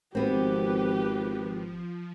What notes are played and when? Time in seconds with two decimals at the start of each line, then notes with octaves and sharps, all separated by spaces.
0.15 G#1 F3 B3 C4 G4 B4